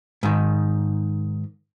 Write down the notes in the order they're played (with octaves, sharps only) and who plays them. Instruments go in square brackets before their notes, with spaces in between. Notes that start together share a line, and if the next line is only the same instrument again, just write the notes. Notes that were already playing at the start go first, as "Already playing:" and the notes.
[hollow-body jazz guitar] G#2 D#3